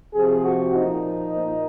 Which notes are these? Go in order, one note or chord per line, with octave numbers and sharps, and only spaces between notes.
C3 F3 G#4
F#4
A#2 F3 D#4
A#2